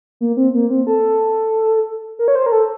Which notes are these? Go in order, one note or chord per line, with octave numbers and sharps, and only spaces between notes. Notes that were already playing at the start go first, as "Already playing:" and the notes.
A#3
C4
A#3
C4
A4
A#4
C#5
C5
A#4
A4